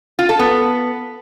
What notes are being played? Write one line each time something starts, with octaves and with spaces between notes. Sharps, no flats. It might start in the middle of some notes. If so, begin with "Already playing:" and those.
F4
A4
B3